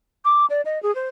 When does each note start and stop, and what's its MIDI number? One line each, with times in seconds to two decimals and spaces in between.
0.25 0.46 86
0.50 0.61 74
0.65 0.81 75
0.83 0.94 68
0.95 1.09 72